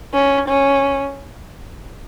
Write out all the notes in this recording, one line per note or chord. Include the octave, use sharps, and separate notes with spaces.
C#4
C#4